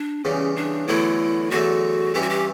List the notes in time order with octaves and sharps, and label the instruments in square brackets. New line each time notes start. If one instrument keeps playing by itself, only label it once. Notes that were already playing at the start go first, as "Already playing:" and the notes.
Already playing: [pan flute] D4
[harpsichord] E2 C#3 G3 [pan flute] C#4
[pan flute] D4
[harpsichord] E2 D3 F#3 A3 [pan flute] E4
[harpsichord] E2 D3 F#3 A3 [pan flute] F#4
[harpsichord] G2 E3 G3 C#4 E4 [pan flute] G4
[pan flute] F#4
G4